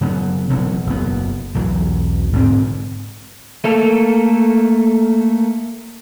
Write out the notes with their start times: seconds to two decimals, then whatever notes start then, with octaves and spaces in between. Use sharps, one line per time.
0.01 C#3 F#3 G#3 B3
0.49 E1 B2 F#3
0.87 F#1 B3
1.55 B1 E2 F#3
2.33 G#2 D3 C4
3.64 A3 A#3 A4